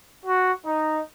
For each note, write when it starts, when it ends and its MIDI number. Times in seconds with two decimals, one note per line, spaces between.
0.25 0.51 66
0.64 1.00 63